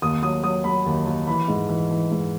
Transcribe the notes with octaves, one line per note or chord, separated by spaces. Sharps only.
D#2 D#6
F#3 D#6
F#3 D#6
F#3 B5
D#2
D#2
E3 B5
G#2
E3
E3
G#2